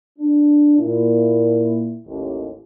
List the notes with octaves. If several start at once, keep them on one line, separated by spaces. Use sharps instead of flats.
D4
A#2 E4
A1 D#2